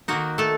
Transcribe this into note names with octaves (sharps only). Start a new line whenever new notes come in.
D#3 A#3 D#4 F#4
A3 A4